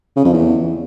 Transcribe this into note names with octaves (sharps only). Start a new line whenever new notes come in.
C#3
F2
E2